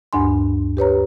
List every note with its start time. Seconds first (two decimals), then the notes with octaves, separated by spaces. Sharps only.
0.13 D2 G2 D4 G#5 C6
0.77 G4 B4 C#5 A#5